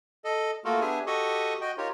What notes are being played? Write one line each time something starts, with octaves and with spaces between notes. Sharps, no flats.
A4 D#5
A3 A#3 F4 F#4 A4 A#4
B3 D4 G4 G#4 E5 G#5
F#4 G4 A4 D#5 C#6 D#6
F#4 D#5 G5
D#4 F4 G4 A#4 C#5